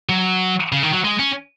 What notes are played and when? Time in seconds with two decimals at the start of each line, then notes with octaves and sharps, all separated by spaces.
0.09 F#3
0.72 C#3
0.83 D#3
0.93 F#3
1.04 G#3
1.19 C#4